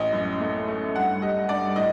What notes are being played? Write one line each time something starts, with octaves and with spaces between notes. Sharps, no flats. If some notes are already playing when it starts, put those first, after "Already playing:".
Already playing: A1 D#5
F#2
A3
A3
G2 F#5
G3 D#5
G2 D5
A2 D#5